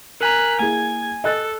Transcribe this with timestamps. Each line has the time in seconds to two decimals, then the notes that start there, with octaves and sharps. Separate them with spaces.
0.21 A#4 G#5 A#5 F#6 B6
0.59 A#3 E4 G#4 G#5 G#6
1.24 A4 D#5 F#6 A6